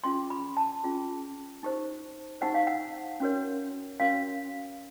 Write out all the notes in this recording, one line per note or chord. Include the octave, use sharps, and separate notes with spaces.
C#4 F4 G#4 C6
B5
A5
C#4 F4 G#4
D#4 G4 C5
D#4 G4 C5 F#5
F5
F#5
C#4 F#4 A#4 C#5
C#4 F#4 A#4 C#5 F5